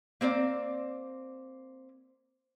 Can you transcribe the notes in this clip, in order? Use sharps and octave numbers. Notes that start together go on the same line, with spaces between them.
A#3 C4 C5 D5